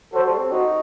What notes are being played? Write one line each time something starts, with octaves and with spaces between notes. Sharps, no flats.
F#3 F#4 A4 C5
G3
C4
D#4 F#4